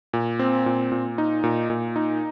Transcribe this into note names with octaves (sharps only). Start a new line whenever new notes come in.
A#2
C4
A#2
A#2
D#4
A#2
A#2
D#4